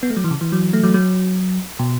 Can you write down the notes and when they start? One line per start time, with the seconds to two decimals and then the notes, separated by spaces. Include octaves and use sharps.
0.03 B3
0.10 A3
0.17 F#3
0.24 E3
0.31 C#3
0.41 E3
0.52 F#3
0.73 A3
0.83 F#3
0.94 F#3
1.79 B2